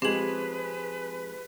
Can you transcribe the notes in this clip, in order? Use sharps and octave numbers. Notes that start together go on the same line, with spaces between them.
F3 G#3 C4 G4 G#4 B4 F#7